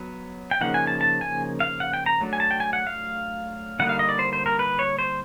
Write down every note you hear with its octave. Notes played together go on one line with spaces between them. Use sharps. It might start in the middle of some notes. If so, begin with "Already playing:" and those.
Already playing: F#3 B3
G5
C#3 F3 A#3 D#4 F#5
G#5
A5
A5
G#5
F5
F#5
G5
A#5
F#3 A3 D4
G#5
A5
G5
G#5
F#5
F5
D3 G3 A#3 D#4 F#5
F5
D#5
D5
C5
C5
A#4
B4
C#5
C5